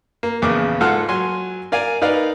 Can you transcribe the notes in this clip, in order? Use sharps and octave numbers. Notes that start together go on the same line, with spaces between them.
A#3
A#1 E2 C#3 D6
G#2 F4 A4 F#5 F6
F#3 G#5 C6
A#4 D5 F5 G#5
D#4 A#4 B4 D5 F5